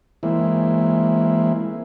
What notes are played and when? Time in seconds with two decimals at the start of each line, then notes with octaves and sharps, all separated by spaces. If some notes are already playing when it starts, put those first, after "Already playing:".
0.23 E3 G#3 A#3 C4 E4